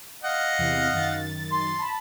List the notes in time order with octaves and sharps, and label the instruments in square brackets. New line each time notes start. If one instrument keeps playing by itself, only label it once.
[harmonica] D#5 F5 F#5
[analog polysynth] E2 C3 E3
F#2 D#3 A6
[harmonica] C6
[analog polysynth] A5 B5